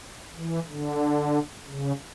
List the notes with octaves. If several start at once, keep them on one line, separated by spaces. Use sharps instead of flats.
E3
D3
C#3